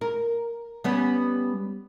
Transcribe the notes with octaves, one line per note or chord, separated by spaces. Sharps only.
A#4
G3 B3 C#4